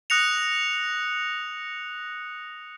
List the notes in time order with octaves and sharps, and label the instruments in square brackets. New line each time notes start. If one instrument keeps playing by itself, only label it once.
[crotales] D#6 F#6 A#6 C#7 F7